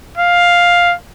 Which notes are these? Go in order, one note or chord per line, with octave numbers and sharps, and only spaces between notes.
F5